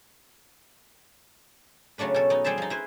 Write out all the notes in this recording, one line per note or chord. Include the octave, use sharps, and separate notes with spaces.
C#3 F#3 A3 D4 B4
B2 C#4 A4
B3 D#4
G3 G#4 C5 E5 A5
F3 D#4
E4 B4 C5